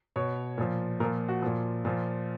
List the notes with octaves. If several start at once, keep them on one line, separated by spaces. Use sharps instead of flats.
B2 C#5
A#2 F3
A#2 F3 A#4
F#4
A#2 F3
A#2 F3